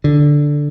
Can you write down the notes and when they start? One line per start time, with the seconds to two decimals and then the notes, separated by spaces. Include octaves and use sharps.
0.04 D3